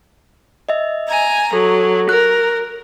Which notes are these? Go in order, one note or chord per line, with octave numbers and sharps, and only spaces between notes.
D#5 E5
G#5 A#5
F#3 A4
A#4 F#6